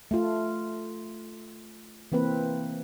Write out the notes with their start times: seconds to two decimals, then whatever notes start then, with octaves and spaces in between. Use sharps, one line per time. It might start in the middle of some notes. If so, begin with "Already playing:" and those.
0.11 A3 F4
2.12 E3 A#3 C4 B4